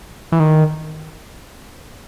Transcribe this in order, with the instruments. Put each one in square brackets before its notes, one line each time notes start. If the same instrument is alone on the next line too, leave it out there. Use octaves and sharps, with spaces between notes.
[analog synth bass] E3
D#3